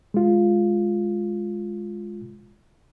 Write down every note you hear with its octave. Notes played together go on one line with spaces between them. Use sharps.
G#3 F4